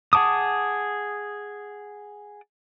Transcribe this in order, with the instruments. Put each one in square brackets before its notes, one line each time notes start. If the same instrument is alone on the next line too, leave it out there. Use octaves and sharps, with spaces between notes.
[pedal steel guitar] G#4 F#5 A5 D6 D#6